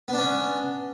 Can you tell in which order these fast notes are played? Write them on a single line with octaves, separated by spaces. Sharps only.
B3 D4 C#4